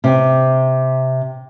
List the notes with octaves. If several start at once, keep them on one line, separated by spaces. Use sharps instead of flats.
C3